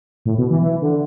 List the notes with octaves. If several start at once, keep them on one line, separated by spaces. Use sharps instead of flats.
A2
B2
E3
E3
D3